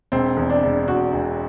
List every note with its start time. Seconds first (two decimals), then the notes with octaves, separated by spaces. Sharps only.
0.12 E1 C4
0.37 E2
0.50 D4
0.63 E1
0.88 E1 F#4
1.13 E1